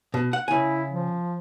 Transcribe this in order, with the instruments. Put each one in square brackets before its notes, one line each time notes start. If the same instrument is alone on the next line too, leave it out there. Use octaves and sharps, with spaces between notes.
[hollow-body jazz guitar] B2
F#5
[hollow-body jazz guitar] C#3 G#5 [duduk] E4
[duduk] F3